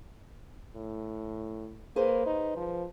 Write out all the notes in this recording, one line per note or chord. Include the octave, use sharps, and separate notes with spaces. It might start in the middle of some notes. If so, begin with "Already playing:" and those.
A2
A#3 G#4 B4 C5
D#4
F3